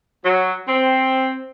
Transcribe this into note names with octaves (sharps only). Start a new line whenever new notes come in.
F#3
C4